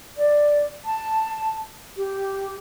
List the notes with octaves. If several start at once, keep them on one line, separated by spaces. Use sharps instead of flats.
D5
A5
G4